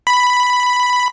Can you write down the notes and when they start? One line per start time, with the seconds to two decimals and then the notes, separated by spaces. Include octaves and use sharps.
0.07 B5